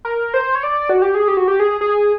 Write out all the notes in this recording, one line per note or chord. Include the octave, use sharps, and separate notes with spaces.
A#4
C5
C#5
D5
F#4
G4
G#4
G4
F#4
G4
G#4
G#4